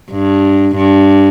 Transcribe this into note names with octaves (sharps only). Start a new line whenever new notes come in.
G2
G2